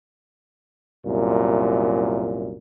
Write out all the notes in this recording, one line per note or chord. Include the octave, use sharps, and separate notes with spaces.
C2 F#2 A#2